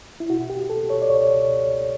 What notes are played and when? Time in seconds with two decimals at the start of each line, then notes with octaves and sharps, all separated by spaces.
0.20 E4
0.30 B2 F#4
0.50 G4
0.56 B2
0.70 A4
0.83 B2
0.90 C#5
1.02 D5
1.10 C#2 C#5
1.36 B2
1.63 C#2